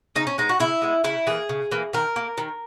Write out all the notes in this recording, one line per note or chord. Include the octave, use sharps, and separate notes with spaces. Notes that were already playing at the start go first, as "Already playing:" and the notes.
C#3 D#4
C#4
G#3 B3 D#4
F#4
C#3 E4
G#3 B3
C#3 E4
E3 A#3 G#4
C#3
E3 A#3
D#3 A#4
A#3
D#3